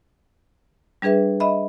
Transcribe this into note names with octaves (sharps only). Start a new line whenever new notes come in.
G3 D4 G#4 B4 E5
D#5 E5 B5